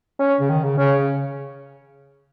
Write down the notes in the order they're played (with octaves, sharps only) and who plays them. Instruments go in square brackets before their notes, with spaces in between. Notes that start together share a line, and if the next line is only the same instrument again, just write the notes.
[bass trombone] C#4
[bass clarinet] C#3
D#3
C#3
[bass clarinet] C#3 [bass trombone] C#4